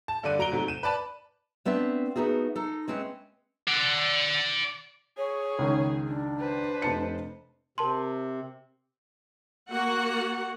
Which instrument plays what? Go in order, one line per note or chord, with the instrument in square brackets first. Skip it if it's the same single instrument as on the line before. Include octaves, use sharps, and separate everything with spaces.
[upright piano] A5
G2 D3 D4 D5 D#7
F#3 A#5 D7 G7
G#2 C3 F#3 A3
D#7 E7
B4 D5 A5 B5
[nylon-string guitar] A3 B3 C4 D4 E5
A3 B3 D#4 F#4 G#4
D#4 A4
G#3 C4 C#4 B4 E5
[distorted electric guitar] D5 F#5
[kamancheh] G#4 [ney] C#5
[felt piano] C#2 D#3
[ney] D4
[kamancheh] B4 C5
[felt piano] F1 A5 C#7
[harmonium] C3 [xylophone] A#4 A5 C6
[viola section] A#3 F#4 F#5